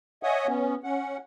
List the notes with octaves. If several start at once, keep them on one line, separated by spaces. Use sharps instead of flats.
C#5 D#5 E5 F#5 G#5 D#6
B3 C#4
C#4 F#5